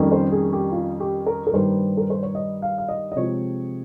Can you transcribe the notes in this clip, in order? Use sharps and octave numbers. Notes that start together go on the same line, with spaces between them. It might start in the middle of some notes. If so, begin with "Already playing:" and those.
Already playing: F2 D#3 G3 A#3 C#4
C5
G#4
G4
F4
G4
A#4
A#4
G2 D#3 G3 A#3 C5
A#4
C5
C#5
D#5
F5
F5
D#5
D#5
C3 F3 G#3 C4 C#5